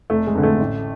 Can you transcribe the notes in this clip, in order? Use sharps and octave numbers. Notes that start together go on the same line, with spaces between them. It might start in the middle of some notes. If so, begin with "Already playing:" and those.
F1 A3
G#3
F2 D3
A3
A1